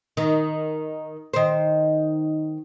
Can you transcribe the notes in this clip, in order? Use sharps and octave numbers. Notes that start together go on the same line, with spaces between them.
D#3
D#3 C5